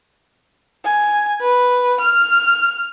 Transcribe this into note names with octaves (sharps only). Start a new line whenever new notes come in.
G#5
B4
F6